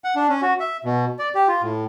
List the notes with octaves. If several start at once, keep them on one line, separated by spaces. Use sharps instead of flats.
F#5
D4
C#4
F#4
E5
B2
D5
G4
F4
A2